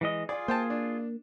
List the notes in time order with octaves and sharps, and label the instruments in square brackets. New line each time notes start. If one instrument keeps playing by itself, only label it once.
[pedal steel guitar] E3 G#3 D#5
[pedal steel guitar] F4 G#4 [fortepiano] D5
[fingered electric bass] A#3 [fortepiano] C5 G5 A5
[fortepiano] D4